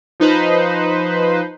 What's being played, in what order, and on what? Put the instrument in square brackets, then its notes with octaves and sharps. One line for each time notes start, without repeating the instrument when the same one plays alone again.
[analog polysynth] F3 D#4 B4 C5